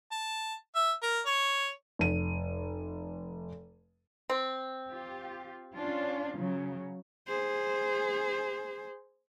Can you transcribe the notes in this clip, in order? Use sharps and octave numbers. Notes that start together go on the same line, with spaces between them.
A5
E5
A#4
C#5
F1 D#7
C4
F4 G4
C#4 D4 F4
C#3 F#3
G#4 C5